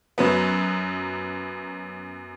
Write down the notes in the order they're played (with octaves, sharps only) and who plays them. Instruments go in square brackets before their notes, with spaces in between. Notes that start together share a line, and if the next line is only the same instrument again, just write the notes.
[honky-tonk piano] F#2 F#3 B3